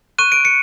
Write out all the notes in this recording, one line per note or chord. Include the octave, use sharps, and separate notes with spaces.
C#6 F#6 D#7
D7
C#7